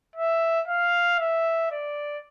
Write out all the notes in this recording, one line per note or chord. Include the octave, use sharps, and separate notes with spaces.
E5
F5
E5
D5